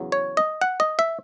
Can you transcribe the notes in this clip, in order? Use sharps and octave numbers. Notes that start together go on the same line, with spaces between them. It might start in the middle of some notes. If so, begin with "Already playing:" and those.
Already playing: E2 C#3 F#3
C#5
D#5
F#5
D#5
E5